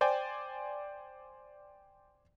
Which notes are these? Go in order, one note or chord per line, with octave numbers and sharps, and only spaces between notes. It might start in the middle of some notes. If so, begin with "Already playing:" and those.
C5 D5 G5 G#5